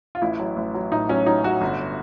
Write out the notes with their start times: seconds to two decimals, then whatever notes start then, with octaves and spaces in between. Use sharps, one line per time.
0.15 F4
0.22 A1 E4
0.40 F#3
0.56 A1
0.74 F#3
0.92 A2 D#4
1.09 F#3 C#4
1.26 F#3 D#4
1.44 F#3 F#4
1.61 G1